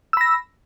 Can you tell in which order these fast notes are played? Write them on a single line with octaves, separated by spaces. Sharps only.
E6 B5 A#6